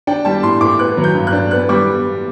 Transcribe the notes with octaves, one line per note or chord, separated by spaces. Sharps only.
D4 G5
G3 A5
A2 C6
A2 D6
B3 F#6
F#3
G6
G2
F#6
D4
B3 F#6
G3 D6